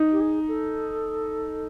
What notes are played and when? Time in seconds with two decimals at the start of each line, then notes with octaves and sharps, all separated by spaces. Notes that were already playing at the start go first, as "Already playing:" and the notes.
Already playing: D#4
0.12 G4
0.20 G#4
0.47 A4